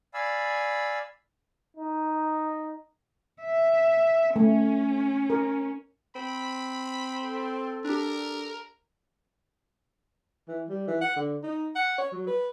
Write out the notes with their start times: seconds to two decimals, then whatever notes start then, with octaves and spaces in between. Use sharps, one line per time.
0.14 D5 F5 G#5 B5 E6
1.77 D#4
3.42 E5
4.36 A3 C#4
5.30 A#4
6.16 C4 B5
7.22 A4
7.84 D4 G4 A#4
10.48 E3
10.69 G3
10.87 E3
11.01 F#5
11.16 D3
11.43 D#4
11.76 F#5
11.98 C#5
12.12 F#3
12.27 B4